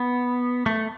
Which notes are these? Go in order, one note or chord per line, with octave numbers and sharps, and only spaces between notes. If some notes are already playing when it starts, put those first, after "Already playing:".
Already playing: B3
A3